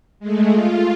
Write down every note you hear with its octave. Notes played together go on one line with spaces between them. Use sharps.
G#3 A3
F4